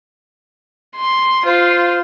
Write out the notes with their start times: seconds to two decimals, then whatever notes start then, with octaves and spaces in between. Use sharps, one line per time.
0.96 C6
1.46 F4 C5